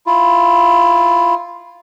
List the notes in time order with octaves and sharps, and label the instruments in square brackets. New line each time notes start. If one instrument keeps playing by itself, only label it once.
[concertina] E4 F4